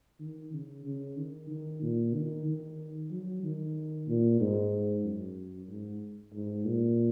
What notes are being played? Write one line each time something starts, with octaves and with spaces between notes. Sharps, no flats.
D#3
C#3
C#3
D#3
D#3
A#2
D#3
D#3
F#3
D#3
A#2
G#2
F#2
G#2
G#2
A#2